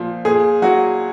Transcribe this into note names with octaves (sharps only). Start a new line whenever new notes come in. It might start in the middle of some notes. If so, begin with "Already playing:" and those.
Already playing: A#2 F3
A#2 G#4
F#3 F#4